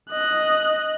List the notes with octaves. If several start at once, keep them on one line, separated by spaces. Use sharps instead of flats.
D#5 F#6